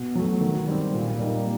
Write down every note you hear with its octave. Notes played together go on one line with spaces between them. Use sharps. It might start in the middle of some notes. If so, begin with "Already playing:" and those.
Already playing: B2
F#3 A3
D#3
G3 C4
A#2
G3 A#3 D#4